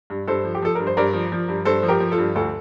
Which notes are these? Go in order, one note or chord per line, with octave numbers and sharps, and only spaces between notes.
G2
G2 A4 C5
F3
G4
F3 A4
G2 A#4
C5
G2 A#4 D5
F3
F3
G2
G2 A4 C5
F3
G4 A#4
F3
F4 A4
G2
D2 F4 A4